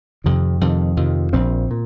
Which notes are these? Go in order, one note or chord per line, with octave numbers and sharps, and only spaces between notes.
F2 C3 D#3
F2 C3 D#3
F2 C3 D#3
A#1 A#2 F3 C4
A#2